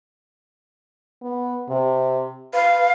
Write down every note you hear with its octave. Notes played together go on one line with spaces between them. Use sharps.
B3
C3
B4 F5